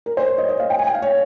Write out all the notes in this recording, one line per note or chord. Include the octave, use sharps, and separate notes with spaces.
A#4
C5
C#5
D#5
D#5
F5
G5
G#5
G5
F5
C#5